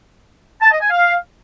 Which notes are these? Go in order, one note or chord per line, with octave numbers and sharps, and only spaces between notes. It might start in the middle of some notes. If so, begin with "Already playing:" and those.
A5
D#5
G#5
F5